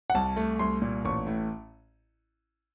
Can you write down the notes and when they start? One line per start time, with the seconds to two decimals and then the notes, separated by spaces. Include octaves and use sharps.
0.10 F#5
0.15 C2 A5
0.37 A3
0.59 C2 C6
0.82 A#2
1.05 A1 C#6
1.27 A2